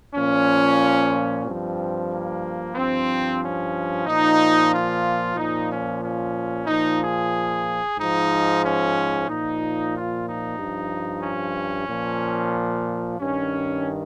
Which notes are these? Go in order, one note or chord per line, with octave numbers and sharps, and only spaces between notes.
A#2 F3 C#4
G2 F3 C4
A#3
G2 F3 C4
C#4
A#2 F3 D#4
F4
A#2 F3 D#4
C#4
C#4
A#2 F3 D#4
G#4
G#2 F3 D#4
C#4
A#2 F3 D#4
F4
D#4
G2 F3
C#4
A#2 F3
G2 D#3 C#4